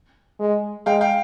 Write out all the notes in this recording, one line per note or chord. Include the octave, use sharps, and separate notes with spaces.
G#3
G#3 F5 G5
F5 G5